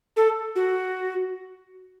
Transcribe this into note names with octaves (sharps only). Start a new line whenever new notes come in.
A4
F#4